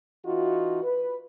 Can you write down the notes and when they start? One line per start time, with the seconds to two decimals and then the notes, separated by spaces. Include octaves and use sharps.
0.24 E3 D#4 F4 F#4
0.83 B4